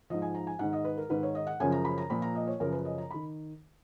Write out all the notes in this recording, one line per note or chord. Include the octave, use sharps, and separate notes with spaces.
G#2 F3 D#5
G#5
A#5
G#5
G#2 D#3 F#5
D#5
B4
A#4
G#2 D#3 B4
C#5
D#5
F#5
F#2 C#3 F3 G#5
A#5
B5
A#5
A#2 F3 B5
A#5
D#5
C#5
F#2 C#3 F3 A#4
B4
D#5
A#5
D#3 B5